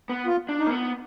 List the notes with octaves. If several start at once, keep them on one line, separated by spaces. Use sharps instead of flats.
B3
F4
D4
D#4
A#3
B3